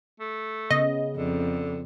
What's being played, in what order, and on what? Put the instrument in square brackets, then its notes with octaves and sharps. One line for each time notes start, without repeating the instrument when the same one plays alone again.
[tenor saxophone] A3
[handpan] C#3 B3 [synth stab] D#5
[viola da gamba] F2 [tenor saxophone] D3